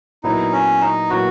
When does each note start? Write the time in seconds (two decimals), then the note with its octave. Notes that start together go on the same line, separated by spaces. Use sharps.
0.24 A#2 F#3 B3 D#4 E4
0.52 C#4
0.81 D#4
1.10 A#2 F#3 B3 E4 F#4